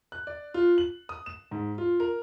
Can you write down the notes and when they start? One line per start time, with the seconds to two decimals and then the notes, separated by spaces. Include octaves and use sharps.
0.12 F#6
0.27 D5
0.54 F4
0.78 F#7
1.09 D#6
1.26 E7
1.51 G#2
1.78 F4
2.00 A#4